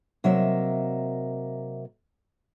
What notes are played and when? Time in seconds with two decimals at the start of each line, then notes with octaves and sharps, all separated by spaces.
0.24 C3 F#3 A#3 A#4 D#5 E5